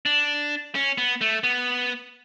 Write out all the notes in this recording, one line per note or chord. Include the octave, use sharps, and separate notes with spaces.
D4
C#4
B3
A3
B3